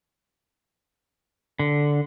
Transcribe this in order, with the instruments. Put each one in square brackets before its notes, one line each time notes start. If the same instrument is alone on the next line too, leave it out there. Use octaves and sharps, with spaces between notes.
[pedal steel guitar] D3